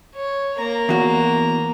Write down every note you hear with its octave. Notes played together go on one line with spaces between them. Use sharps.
C#5
A#3 A#5
E2 F#4